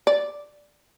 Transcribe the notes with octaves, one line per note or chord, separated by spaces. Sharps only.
D5